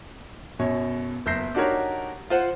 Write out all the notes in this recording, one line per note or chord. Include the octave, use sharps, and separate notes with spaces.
F#2 B2 C#5
F#1 B3 E5 G6 A#6 C7
D4 D#4 F#4 G4 A#4 C#5
F4 C5 F#5